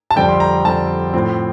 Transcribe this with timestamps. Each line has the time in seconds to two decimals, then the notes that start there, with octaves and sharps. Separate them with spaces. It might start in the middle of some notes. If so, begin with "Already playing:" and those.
0.11 A5
0.16 F2 D3 G3 C4 G5
0.29 C6
0.40 A#5
0.65 F2 D3 G3 C4 A5
1.14 A2 F3 C4